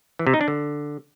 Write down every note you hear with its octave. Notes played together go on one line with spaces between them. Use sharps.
E3
C3
D#4
D4
D3